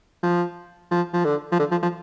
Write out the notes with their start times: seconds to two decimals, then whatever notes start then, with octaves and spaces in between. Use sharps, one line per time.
0.23 F3
0.91 F3
1.13 F3
1.25 D3
1.52 F3
1.59 D3
1.71 F3
1.83 F3